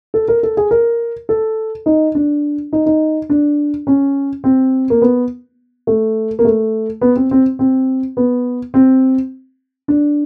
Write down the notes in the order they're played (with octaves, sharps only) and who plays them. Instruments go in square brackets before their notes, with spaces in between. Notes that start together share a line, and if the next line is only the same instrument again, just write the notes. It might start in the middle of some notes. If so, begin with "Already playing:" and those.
[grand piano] A4
A#4
A4
G#4
A#4
A4
D#4
D4
D#4
D#4
D4
C#4
C4
A#3
B3
A3
A#3
A3
B3
C4
C4
C4
B3
C4
D4